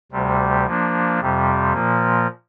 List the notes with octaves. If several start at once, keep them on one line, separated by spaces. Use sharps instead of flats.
D2 C3 G3
F3 A#3 D4
F2 C3 G3
A#2 F3 A#3